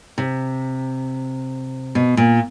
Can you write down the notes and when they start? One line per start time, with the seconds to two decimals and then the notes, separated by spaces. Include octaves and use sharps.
0.18 C3
1.95 B2
2.17 A#2